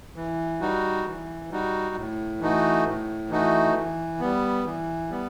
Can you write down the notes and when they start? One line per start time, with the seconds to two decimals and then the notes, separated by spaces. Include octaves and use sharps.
0.16 E3
0.61 G3 D#4 F#4
1.05 E3
1.51 G3 D#4 F#4
1.96 A2
2.40 E3 A3 D#4 F#4
2.86 A2
3.30 E3 A3 D#4 F#4
3.76 E3
4.20 G3 B3
4.66 E3
5.09 G3 B3